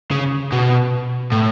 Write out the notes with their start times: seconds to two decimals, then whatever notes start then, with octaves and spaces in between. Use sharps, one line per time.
0.11 C#3
0.52 B2
1.32 A2